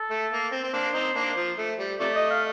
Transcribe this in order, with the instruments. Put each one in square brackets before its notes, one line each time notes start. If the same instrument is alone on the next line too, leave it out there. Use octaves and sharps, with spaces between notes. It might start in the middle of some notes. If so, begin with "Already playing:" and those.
Already playing: [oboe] A4
[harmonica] A3
A#3
C4
C4
[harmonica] A#3 D4 [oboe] C5
[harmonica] C4 D#4
A#3 D4
F3
A3
G3
[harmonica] C3 F3 A3 [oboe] D5
[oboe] D#5
F5